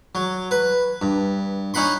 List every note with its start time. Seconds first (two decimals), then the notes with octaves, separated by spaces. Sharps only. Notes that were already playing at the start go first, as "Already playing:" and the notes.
0.15 F#3
0.51 B4
1.02 G2
1.74 C#4 D#4 F#5 B5 C6